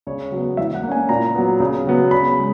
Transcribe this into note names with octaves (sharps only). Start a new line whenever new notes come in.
C#3 C#5
F#3 B3
E3 E5
F#5
A#3
C#4 G#5
A#2 A#5
F#3 B3
C#3
F#3 B3
C#3 B5
G#3